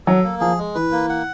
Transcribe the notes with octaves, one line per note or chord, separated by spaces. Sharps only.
F#3 A4
A#3
F3 G#4
G#3
E3 B4
A#3
F#5